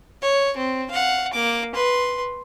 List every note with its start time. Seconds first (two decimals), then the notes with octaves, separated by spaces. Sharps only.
0.22 C#5
0.57 C4
0.91 F5 F#5
1.33 A#3 D6
1.75 B4 C6